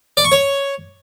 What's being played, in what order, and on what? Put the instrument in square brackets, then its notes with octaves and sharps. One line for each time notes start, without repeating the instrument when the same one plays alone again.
[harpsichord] D5
C#6
C#5